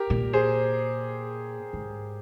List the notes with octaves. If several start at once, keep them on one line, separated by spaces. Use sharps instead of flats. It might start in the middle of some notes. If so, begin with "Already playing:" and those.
Already playing: G4 A#4
A#2
G#4 C5
G#2